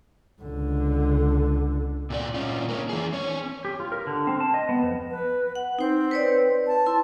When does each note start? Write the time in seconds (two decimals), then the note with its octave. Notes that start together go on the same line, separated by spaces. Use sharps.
0.42 C#2 D3
2.10 A#2 F#4 D5
2.34 A#2 C#4 F4
2.69 A#3 C4 C#4
2.89 E3 G#4
3.13 C4 C#5
3.65 G4
3.80 F4
3.92 A#4
4.07 D3
4.27 C4
4.40 A5
4.54 D#5
4.69 B3
4.83 F2
5.11 B4
5.55 F#5
5.79 C4 D#4 C5
6.11 B4 C#5 D5
6.67 A5
6.86 E4 C6